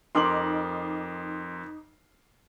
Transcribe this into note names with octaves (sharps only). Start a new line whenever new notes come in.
F2 D#4 A#4 C6 D6 F#7